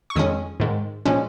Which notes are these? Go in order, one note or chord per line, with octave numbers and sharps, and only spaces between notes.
C#6
F2 D#3 G#3 C#4 D#6
G#2 D#3 G#3
A#2 F3 G#3 C#4